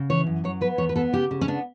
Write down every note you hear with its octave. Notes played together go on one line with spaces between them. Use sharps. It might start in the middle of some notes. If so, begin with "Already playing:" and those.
Already playing: C#3
E3 C#5
F#2
F#3 C#5
B3 B4
E2 C#5
B4
B3 A4
C#3 G4
C#3
C#4
B3 D4